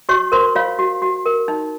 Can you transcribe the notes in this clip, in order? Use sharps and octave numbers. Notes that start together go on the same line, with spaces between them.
F#4 C#5 C#6
A#4 C5 C6
F4 C#5 F5
F#4
F#4
A#4
D#4